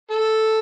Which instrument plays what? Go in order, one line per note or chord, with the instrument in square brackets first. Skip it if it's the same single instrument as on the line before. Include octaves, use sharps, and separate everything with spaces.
[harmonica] A4